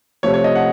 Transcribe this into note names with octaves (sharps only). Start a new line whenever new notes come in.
C3 F3 A3 C#5
C#5
D#5
F#5